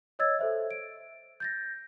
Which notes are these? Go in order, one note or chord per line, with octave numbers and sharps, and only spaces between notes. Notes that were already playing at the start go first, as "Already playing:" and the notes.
C#5 D#5 E6 G#6 A6
A4 C5 E5
D7
G6 A6 A#6